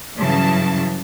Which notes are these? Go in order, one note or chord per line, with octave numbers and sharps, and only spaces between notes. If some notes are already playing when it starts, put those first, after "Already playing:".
G2 C#3 E3 F#3 A5